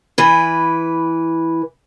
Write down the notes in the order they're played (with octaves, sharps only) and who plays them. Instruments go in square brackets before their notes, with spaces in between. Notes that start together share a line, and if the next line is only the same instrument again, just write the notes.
[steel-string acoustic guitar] E3 B4